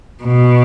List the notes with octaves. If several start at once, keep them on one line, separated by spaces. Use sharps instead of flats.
B2